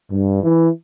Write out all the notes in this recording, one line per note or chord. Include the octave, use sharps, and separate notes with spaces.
G2
E3